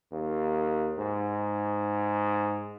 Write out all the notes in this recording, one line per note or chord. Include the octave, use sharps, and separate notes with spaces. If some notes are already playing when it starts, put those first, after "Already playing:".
D#2
G#2